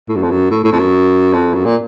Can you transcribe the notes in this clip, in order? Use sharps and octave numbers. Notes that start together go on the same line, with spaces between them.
A2
F#2
F2
F#2
A2
A2
F2
F#2
F2
F#2
A#2